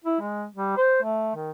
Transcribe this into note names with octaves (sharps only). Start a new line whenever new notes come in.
E4
G#3
G3
C5
A3
D#3